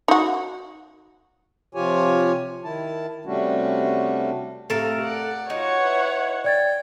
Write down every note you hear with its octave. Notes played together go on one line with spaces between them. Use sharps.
D#4 F#4
C3 F3 F4 G4 C#5 G#5
D#3 E4 A5
C3 G3 A3 C#4 D4 F#4
A2 C3 A3 A4 A#4 F5
D5 F#5
D#4 F4 F#4 C#5 F#5
E4 B4
D5 G5 G#6 A6